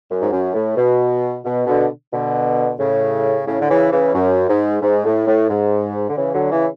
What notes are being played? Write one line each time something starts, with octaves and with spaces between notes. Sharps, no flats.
F#2
G#2
F#2
A2
B2
B2
B2 D3
B2 D3
A2 C#3
A2 C#3
D3
C#3 E3
C#3 E3
F#2
G#2
G#2
A2
A2
G#2
D3
C#3 E3
D3 F#3
C#3 E3